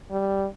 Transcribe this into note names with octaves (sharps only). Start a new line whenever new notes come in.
G3